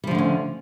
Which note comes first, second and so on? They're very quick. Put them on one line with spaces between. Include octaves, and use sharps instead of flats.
G3 F3 D3 A3 C#4